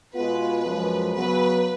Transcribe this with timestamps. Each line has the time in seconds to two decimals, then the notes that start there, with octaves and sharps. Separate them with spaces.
0.15 B2 G#3 B3 F4 B4
0.65 F#2 F3 G#3
1.15 C#3 F#3 B3 B4